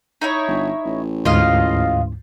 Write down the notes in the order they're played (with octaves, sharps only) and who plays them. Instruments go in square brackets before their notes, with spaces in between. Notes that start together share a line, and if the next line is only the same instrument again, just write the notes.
[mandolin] D#4 E4 C#5
[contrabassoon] G1
A1
[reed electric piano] D2 G#2 [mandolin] F4 D#5 F5